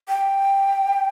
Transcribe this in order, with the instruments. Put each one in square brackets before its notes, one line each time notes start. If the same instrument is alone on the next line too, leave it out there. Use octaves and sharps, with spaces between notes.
[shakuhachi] G5